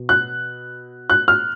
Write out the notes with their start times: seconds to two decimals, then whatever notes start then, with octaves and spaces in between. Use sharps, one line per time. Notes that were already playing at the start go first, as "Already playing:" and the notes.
Already playing: B2
0.09 F#6
1.10 F#6
1.28 F6